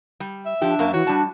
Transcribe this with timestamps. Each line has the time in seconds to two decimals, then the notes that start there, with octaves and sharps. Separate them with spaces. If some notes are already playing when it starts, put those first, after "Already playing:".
0.20 G3
0.46 E5
0.62 F3 D4 G4
0.79 F#2 A#3
0.94 E3 F#4 C#5
1.07 G3 D4 A5